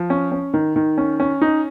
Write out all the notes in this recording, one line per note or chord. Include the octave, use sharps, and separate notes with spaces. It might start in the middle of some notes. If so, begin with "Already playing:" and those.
Already playing: F3
C#4
C#4
D#3
D#3
C#4
C#4
D#4